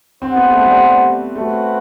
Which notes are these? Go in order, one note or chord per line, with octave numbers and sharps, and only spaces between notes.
C4 D4 G4 C5 F#5
B3
A3
G3
A3 C4 F#4 B4